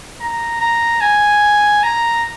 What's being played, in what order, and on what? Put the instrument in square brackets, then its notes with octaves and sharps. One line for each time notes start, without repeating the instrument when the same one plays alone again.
[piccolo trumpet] A#5
A#5
G#5
A#5